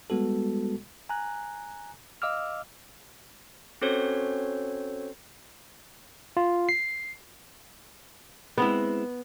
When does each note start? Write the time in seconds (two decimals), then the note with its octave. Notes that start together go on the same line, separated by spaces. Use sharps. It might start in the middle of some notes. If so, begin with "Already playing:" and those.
0.10 G3 G#3 B3 F#4 A4
1.09 G#5 A#5 F#6
2.22 D#5 F5 D6 E6 F6
3.82 C4 C#4 F#4 A4 C5 C#5
6.37 F4
6.69 C7
8.58 G#3 B3 C4 E4